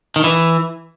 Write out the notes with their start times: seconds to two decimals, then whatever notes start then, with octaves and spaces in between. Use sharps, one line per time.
0.16 D#3
0.24 E3